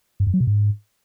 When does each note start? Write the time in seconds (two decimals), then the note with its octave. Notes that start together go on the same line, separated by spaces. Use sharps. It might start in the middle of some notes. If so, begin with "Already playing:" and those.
0.20 G2
0.27 F#2
0.34 F#3
0.40 B2
0.47 G#2